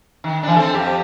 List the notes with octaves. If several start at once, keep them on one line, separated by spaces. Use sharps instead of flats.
D#3
E3 D4
C4 A4
F2 G4